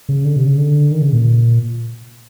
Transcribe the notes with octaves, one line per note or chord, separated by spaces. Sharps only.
C#3
D3
C3
C#3
D3
D#3
C#3
A#2